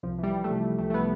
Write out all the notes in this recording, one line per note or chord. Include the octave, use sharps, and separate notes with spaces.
C2 F3
E3 G3
C2
C3 A3
C3
C2 A3
A3
C3 B3